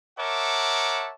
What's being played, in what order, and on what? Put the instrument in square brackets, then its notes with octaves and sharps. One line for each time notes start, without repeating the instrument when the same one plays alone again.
[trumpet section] A#4 C#5 E5 F#5 A5 D6